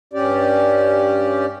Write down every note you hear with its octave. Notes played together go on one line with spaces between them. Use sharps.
G2 C#4 G4 D5